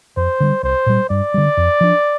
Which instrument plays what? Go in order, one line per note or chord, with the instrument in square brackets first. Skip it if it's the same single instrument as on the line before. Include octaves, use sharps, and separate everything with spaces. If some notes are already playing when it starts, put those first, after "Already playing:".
[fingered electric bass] F2 [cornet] C5
[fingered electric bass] D3 G3
[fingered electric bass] C2 [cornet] C5
[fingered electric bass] A#2 G3
[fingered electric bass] G2 [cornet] D5
[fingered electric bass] D3 G3
F2
F3 D4